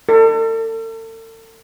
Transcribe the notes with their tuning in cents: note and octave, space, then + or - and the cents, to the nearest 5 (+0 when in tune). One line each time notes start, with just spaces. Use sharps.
A4 +40